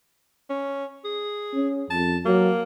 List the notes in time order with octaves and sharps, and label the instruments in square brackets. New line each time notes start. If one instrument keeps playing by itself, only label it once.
[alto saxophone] C#4
G#4
[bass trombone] C#4
[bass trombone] F2 [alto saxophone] A5
[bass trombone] F#3 [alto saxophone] A#3